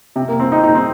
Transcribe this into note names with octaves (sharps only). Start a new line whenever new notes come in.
C3
A#3
C4
D#4
D#4
C4